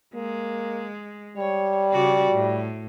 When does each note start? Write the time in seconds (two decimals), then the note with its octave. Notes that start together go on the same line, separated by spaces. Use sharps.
0.15 G#3 A#3
1.37 G3 C#5
1.92 C#3 F#4 D5
2.32 A2